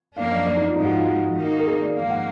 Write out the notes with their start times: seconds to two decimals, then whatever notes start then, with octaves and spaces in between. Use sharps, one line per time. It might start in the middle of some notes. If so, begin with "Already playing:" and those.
0.16 F#2 F3 A#3 D4 F5
0.32 D#5
0.46 D5
0.56 D#4
0.67 F4
0.76 G#2 F3 G#3 D#4
0.85 F#4
0.91 F4
1.06 F#4
1.36 D#3 A#3 D#4
1.59 A#4
1.66 G#4
1.81 D5
1.95 G#2 F3 A#3 F5
2.10 F#5